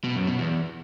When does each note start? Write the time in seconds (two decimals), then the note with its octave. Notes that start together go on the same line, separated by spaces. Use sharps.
0.04 B2
0.16 F#2
0.27 B2
0.39 E2